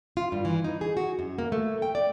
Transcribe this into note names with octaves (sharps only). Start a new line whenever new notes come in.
F4
G2
E3
D#4
G#4
F#4
F#2
A#3
A3
G5
D5